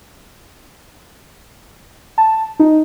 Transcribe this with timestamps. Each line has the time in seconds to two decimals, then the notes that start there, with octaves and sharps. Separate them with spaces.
2.18 A5
2.59 D#4